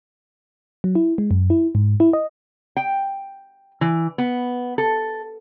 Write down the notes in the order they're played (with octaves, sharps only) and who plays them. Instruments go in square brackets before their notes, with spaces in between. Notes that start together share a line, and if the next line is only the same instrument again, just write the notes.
[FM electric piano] F#3
E4
G#3
F#2
E4
G#2
E4
D#5
[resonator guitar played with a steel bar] G5
E3
B3
A4